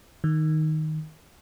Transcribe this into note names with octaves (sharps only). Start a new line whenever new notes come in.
D#3